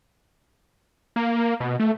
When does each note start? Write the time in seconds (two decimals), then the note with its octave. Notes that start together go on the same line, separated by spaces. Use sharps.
1.16 A#3
1.60 B2
1.80 A3